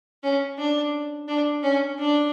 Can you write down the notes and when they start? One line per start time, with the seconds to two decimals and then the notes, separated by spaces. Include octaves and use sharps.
0.23 C#4
0.58 D4
1.28 D4
1.63 C#4
1.99 D4